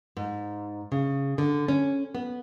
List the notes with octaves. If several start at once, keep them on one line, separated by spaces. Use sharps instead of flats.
G#2
C#3
D3
C#4
B3